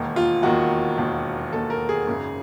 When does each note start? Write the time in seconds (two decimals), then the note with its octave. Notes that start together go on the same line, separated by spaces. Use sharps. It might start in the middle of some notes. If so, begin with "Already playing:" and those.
Already playing: E1 D#2 D#3
0.16 F4
0.43 E1 D#2 D#3 F#4
0.98 E1 D#2 D#3
1.53 E1 D#2 D#3 A4
1.70 A#4
1.89 G#4
2.07 G#1 F#2 C#3